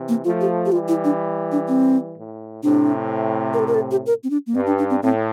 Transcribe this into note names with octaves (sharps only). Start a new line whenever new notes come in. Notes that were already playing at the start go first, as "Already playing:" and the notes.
Already playing: C3 E3
A#3
F3 A3 F4
G4
G4
E3 G3 F4
E4
D4
D4
C4
A2
A2 C3 D4
A#4
A4
A#4
A4
G4
A#4
C4
D4
A#3
G2 C4
D4
D4
C4
A2 C4